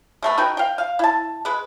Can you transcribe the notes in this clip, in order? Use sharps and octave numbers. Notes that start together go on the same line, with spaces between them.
G#3 A3 B3
D#4 F#4 B4 G5
F5 G5
F5
E4 A5
G#3 B4